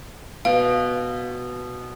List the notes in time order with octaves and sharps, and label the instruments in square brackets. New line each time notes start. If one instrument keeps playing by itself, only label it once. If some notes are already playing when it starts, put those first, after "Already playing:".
[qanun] B2 [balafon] F5